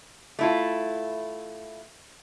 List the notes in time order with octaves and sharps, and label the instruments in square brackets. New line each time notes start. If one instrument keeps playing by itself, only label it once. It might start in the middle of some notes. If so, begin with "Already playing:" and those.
[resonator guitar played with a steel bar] A3 E4 F4